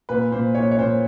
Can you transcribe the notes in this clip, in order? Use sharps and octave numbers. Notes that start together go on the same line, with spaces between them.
A#2 B4
A#2 C5
A#2 C#5
C#5
A#2 C5